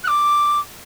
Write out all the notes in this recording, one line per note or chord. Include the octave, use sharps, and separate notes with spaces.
F#6
D6